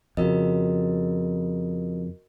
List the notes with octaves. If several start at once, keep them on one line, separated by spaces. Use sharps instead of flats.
F2 C#3 F#4 A#4 D#5